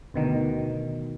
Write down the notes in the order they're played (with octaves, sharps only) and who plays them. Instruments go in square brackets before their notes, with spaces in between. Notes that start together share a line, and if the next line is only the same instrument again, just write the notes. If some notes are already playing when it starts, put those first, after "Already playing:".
[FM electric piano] D2 B2 D#3